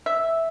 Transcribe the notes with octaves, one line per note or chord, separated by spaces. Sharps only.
E5